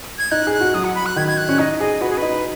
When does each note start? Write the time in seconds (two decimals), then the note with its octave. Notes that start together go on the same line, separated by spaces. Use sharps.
0.18 G#6
0.32 D#4 F#6
0.47 G#4
0.53 F#6
0.61 F#4
0.74 F#3 D#6
0.84 F#5
0.95 B5
1.06 F#6
1.16 D#3 G#6
1.27 G#6
1.38 F#6
1.49 C#4
1.59 D#4 D#5
1.80 G#4 D#5
2.01 F#4 B4
2.10 G#4
2.18 D#4 B4